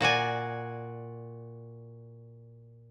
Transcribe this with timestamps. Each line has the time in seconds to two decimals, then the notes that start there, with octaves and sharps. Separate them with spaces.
0.01 A#2 F#4 D5 G#5